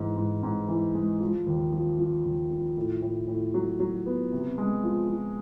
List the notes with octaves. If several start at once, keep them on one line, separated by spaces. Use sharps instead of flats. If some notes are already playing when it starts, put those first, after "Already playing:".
Already playing: G#2 E3
G#2
G#2
E3
G#3
F3
D#2
F3
F3
D#2
F3
A2
A2
A2
F#3
F#3
B3
C3
G#3
F3
F3